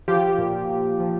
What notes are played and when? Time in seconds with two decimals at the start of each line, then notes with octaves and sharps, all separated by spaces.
0.08 F3 F4 G4
0.38 A#2
0.69 A#2
1.00 F3